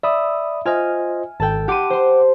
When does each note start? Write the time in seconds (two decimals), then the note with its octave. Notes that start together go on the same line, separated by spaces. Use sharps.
0.03 D5 E5 B5 D#6
0.66 F4 C5 D#5 G#5 F6
1.40 G#1 A4 G5 A5
1.68 G4 F#5 C6 D6 D#7
1.90 C5 C6